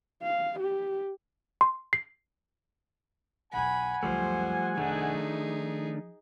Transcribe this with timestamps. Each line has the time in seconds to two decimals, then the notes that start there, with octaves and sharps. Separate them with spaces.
0.23 F5
0.60 G4
1.61 C6
1.93 C7
3.53 B1 E2 F#5 G#5 B5
4.03 C#2 F#2 F3 G3 A3 C5
4.77 F1 D#3 A3 D4 D#4 G#4
5.14 F3